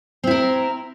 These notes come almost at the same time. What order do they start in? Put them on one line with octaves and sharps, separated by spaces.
C4 E4 A#4